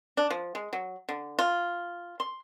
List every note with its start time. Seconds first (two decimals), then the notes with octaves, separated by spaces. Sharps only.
0.17 D4
0.30 F3
0.55 G#3
0.73 F#3
1.09 D3
1.39 F4
2.20 C6